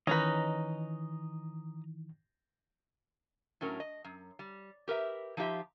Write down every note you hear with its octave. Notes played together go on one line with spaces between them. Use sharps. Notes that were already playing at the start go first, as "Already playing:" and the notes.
D#3 E3 C#4 D#4 B4 D#5 A#5
A2 F#3 C#4 A#4
D#5
F#2
G3
G4 A#4 B4 E5
F3 D#4 F4 G4 E5